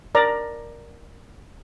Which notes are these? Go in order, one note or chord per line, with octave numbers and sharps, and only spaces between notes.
A#4 D5 A#5